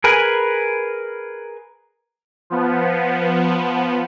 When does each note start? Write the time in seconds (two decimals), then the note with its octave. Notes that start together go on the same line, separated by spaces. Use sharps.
0.04 G#4 A#4 B4 G#5
2.50 F3 B3